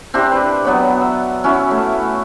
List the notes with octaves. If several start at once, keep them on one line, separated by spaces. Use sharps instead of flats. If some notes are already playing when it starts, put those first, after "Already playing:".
C4 D4 E4 G4
B4
F#3 B3 C#5
E5
C#4 E4 F#4
A3